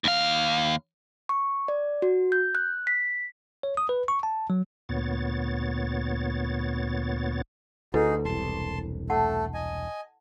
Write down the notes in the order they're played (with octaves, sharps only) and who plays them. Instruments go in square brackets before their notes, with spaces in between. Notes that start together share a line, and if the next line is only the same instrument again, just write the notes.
[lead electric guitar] D#2 F5
[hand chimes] C#6
D5
F#4
G6
F#6
B6
[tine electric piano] C#5
D#6
B4
C#6
A5
F#3
[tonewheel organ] D2 A#2 B3 C#5 A6
[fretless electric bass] D2 [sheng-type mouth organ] D#4 F#4 G#4 [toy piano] E4 A4 B4
[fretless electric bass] E1 C2 [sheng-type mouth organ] A5 C6
[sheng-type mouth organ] A3 A4 [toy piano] F#5 A5
[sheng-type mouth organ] D#5 G#5